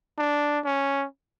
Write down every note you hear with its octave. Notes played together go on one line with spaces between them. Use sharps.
D4
C#4